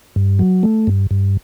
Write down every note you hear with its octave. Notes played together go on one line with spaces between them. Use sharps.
G2
F#3
A3
G2
G2